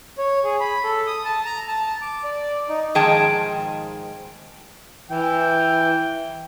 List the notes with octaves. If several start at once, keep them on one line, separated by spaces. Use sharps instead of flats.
C#5
G#4
B5
A4
D#6
A5
A#5
A5
D6
D5
D#4
G#2 D#3 F3 G#4 G5 A5
E3 G5